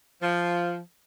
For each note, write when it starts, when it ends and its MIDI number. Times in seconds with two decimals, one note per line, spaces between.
0.22 0.78 53